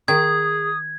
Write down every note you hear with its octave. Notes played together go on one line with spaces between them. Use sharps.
D#3 G#4 D#6 G#6